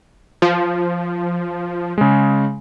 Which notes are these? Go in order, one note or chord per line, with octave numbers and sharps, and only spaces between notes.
F3
C#3 G#3